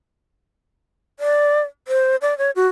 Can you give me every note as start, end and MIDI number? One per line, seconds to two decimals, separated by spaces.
1.20 1.62 74
1.88 2.16 72
2.22 2.37 74
2.38 2.51 73
2.56 2.67 66